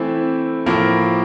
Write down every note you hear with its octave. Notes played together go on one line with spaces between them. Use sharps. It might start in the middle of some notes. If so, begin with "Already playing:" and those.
Already playing: E3 A3 C4 E4
A2 F3 A#3